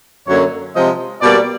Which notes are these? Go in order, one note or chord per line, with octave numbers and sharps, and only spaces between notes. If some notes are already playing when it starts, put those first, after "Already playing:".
F#2 D3 F#3 A#3 C#5
C3 F3 G#3 D#5
B2 G3 A#3 D5